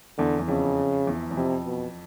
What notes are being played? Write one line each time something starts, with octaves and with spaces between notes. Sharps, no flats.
E2 D3
E2
F2 C#3
E2
E2
F2 C3
B2